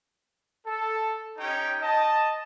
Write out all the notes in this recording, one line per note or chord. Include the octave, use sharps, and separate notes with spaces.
A4
C#4 D#4 G4 C#5 G5
D#5 A5